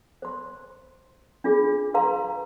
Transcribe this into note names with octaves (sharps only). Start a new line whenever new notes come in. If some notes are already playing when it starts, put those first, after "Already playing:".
C5 C6
D4 F4 G#4
B4 F5 A#5 C6